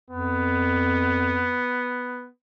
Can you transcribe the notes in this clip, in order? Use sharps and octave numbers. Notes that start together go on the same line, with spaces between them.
F2 B3